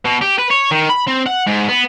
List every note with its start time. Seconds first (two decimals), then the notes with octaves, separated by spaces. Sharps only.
0.05 B2
0.22 G4
0.39 B4
0.51 C#5
0.71 D#3
0.89 B5
1.07 C4
1.26 F#5
1.47 G#2
1.68 B3